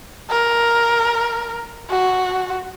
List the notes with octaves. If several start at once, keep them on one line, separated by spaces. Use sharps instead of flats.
A#4
F#4